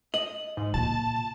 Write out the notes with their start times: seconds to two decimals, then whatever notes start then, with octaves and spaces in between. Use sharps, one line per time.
0.14 D#5 F#7
0.57 G#2
0.74 A#2 F4 A5